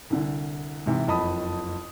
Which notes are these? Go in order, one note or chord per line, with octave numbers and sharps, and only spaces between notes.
C2 D3
G#2 C3 E3
F#1 F2 D#5 A5 B5 D#6